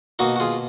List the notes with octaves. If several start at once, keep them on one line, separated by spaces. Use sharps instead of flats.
B2 A#3 D#4 F#4
F#4
F4 G#4